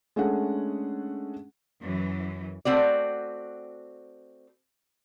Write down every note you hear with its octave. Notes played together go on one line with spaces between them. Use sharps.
G#3 A3 C#4 D4 G#4 F#5
F#2 E3
A3 C4 F#4 D5